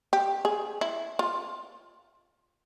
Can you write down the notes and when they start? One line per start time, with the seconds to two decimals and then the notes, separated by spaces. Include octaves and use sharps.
0.13 G4
0.45 G#4
0.81 E4
1.19 F4